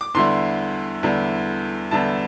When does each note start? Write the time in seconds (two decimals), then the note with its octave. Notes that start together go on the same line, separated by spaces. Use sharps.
0.01 D6
0.14 E2 D3 G3 E4 C6
1.03 E2 D3 G3 E4
1.91 E2 D3 G3 E4 A5